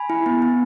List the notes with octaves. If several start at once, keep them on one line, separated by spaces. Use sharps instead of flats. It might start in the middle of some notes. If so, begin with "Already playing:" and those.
Already playing: G#5 B5
E4
B3
B3